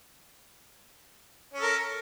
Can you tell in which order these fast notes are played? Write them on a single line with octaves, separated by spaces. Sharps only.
C#4 A4 A#4